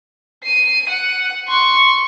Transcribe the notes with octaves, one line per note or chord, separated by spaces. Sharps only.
C7 D#7
F#5
C6 C#6